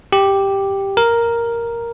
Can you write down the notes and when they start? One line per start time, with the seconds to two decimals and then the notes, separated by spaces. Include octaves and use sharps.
0.13 G4
0.97 A#4